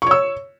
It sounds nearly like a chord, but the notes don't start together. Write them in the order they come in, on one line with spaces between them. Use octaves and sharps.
C#6 C#5 E6